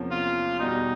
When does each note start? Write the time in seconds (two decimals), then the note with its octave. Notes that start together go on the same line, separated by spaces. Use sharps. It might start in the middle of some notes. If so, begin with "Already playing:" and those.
Already playing: E2 C3 F3 A#3 C#4
0.11 F4
0.59 E2 B2 G3 D#4